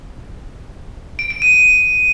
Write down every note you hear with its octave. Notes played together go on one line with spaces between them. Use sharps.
D7
D7
D#7